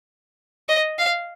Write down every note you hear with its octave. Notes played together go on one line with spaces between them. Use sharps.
D#5
F5